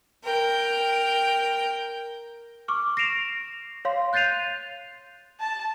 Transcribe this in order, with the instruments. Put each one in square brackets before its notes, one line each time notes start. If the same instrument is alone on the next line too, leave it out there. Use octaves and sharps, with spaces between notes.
[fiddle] A#4 G5
[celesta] C#6 D6 F6
A#6 C7 D7 E7 F7
C#5 F5 C6
F#6 G6 A6 C7 D#7 F7
[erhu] A5